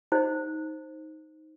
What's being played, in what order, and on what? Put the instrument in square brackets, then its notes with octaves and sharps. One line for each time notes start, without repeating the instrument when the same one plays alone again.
[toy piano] D#4 C5